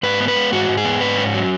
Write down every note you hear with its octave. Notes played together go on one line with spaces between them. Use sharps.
G#2 B4
B3
B4
G#3
G#2 F#4
G#2
G#4
B3
G#2 B4
C#4
F#3